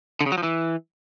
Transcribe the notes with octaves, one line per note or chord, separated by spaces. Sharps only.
D3
C#3
F#3
F3
E3